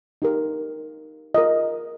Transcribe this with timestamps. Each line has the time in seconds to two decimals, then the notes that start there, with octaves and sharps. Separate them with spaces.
0.22 D#4 G4 A#4
1.34 F4 A#4 D#5